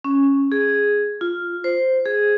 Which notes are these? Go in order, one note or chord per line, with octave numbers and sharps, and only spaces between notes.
C#4
G#4
F4
C5
G#4